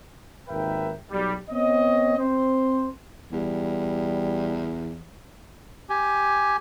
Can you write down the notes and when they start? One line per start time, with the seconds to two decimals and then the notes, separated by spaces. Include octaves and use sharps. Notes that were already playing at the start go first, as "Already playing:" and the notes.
0.48 G#1 D#2 A#4 B4 E5 G5
1.10 B1 G3
1.49 B3 C4 C#5 D#5
2.17 C4 C5
3.32 E2 G3
5.89 G4 G#5